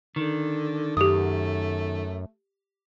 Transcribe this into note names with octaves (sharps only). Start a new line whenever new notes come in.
D3 D#3
F#2 A3 G4 D#6